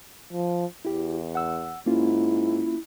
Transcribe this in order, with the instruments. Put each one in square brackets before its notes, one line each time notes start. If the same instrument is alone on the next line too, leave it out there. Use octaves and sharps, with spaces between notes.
[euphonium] F3
[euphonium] E2 [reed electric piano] E4 G4
[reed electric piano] F#5 E6
[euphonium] G#2 [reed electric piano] A#3 C#4 F4 [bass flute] E4